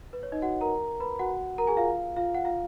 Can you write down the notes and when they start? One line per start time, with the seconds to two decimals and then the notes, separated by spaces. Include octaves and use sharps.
0.13 B4
0.23 C#5
0.32 D#4 D#5
0.42 F#4 F#5
0.61 A#4 A#5
1.00 B4 B5
1.19 F#4 F#5
1.58 A#4 A#5
1.67 G#4 G#5
1.77 F4 F5
2.16 F4 F5
2.34 F#5
2.45 F4 F5